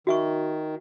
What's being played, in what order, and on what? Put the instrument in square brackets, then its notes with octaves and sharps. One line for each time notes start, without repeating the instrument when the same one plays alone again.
[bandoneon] D#3 [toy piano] F#4 E5 C#6